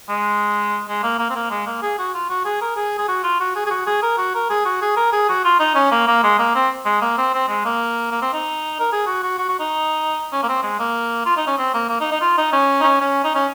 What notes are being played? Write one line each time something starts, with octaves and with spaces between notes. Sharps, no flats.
G#3
G#3
A#3
A#3
C4
A#3
G#3
A#3
G#4
F#4
F4
F#4
G#4
A#4
G#4
G#4
F#4
F4
F#4
G#4
G#4
F#4
G#4
A#4
F#4
A#4
G#4
F#4
G#4
A#4
G#4
F#4
F4
D#4
C#4
A#3
A#3
G#3
A#3
C4
G#3
A#3
C4
C4
G#3
A#3
A#3
C4
D#4
A#4
G#4
F#4
F#4
F#4
F#4
D#4
C#4
A#3
C4
G#3
A#3
F4
D#4
C#4
C4
A#3
A#3
D#4
D#4
F4
D#4
C#4
D#4
C#4
C#4
D#4
C#4